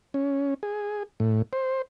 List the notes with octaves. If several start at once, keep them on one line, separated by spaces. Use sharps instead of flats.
C#4
G#4
A2
C5